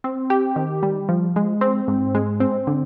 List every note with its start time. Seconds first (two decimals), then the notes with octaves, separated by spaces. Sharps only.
0.04 C4
0.30 G4
0.56 D#3
0.83 G3
1.09 F3
1.36 G#3
1.61 C4
1.88 G#2
2.15 G#3
2.40 C4
2.67 D3